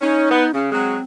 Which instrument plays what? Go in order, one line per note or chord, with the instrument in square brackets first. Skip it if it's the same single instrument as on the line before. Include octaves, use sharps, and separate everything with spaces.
[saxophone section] C#4 [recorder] D#4
[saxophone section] B3
[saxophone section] C#3 [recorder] C#4
[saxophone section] F#3 G#3 F#4 [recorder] C4